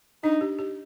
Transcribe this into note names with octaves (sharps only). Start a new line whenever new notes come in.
D4 D#4
G4
G4